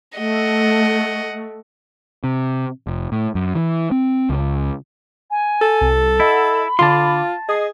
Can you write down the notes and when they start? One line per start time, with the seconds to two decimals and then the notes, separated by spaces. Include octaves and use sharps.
0.18 A3 D#5 F#5
2.24 C3
2.87 F1
3.12 A2
3.35 F#2
3.55 E3
3.91 C4
4.30 C#2
5.31 G#5
5.62 A4
5.81 C2
6.20 E4 D#5 F#5 B5
6.79 D3 F4 A5 C6 D6
7.48 G#4 D#5 D#6 C7